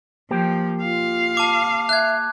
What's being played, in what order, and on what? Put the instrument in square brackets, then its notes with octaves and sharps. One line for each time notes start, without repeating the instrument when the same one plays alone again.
[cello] F3 [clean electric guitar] A#3 G4 G5
[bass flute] F4 [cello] F5
[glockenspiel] A5 D6
[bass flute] E5 [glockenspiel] F#6 G#6